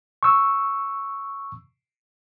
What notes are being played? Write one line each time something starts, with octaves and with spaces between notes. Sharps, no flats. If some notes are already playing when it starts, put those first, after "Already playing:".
C#6 E6